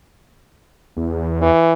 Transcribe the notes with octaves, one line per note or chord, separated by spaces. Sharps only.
E2
E3